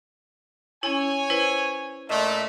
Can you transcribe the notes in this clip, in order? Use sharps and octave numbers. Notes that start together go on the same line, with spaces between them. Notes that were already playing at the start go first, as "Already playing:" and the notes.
C#4 E4 C#5 G#5
E4 B4 C5
A#2 A3 D#5 E5